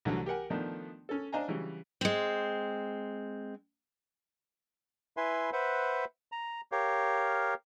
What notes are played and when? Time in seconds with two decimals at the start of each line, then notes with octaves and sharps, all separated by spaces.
0.05 C2 D3 E3 F#3 A3
0.26 G4 A#4 F#5 G#5
0.50 D#3 F3 A3 B3 D4
1.09 C#4 A4
1.32 D4 C5 D#5 F5 G#5 A#5
1.48 C#3 E3 F#3 G3
2.01 G#3 C4
5.17 E4 B4 E5 G#5 C6
5.53 B4 C5 E5 F#5
6.32 A#5
6.72 G4 A#4 C#5 F5